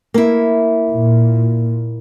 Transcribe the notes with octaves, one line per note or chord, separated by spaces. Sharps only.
A#3 E4
A#2